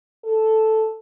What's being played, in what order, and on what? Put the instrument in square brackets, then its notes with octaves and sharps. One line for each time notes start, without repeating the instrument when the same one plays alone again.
[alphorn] A4